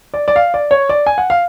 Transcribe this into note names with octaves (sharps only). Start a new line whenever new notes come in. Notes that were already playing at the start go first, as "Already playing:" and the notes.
D5
D5
F5
D5
C#5
D5
G#5
F#5
F5